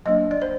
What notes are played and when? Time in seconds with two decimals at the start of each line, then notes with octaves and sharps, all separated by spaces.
0.06 F#3 A#3 D4 D#5
0.31 D5
0.42 C5